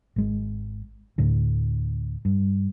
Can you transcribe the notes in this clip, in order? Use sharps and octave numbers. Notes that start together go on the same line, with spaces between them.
G#1 G#3
D2 A2 D3
G2